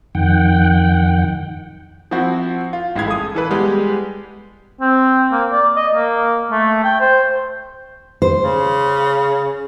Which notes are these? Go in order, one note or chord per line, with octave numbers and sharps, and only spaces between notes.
F2 D#3 F#5 G5
F3 C4 E4 F#4
F4
A1 G#3 E4 F5 G#6
A4 D#6
E3 A4 B4
G3 G#3 B3 G4
C4
A#3
D5
D#5
A#3
A3
G5
C5
C5
C#3